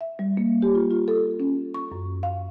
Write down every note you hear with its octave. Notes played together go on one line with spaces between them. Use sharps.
E5
G3
A#3
G4
F4
F4
A4
C#4
C#6
F#2
F5